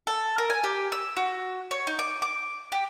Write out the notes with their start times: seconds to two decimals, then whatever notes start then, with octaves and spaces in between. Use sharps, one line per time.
0.07 A4
0.38 A#4
0.50 G#5
0.64 G4
0.92 E6
1.17 F#4
1.71 C#5
1.87 D#4
1.99 D6
2.22 D6
2.72 G4